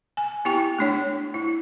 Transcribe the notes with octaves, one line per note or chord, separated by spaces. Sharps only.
G#5
B3 E4 G4 G5 C#6
A3 D4 C#5
E4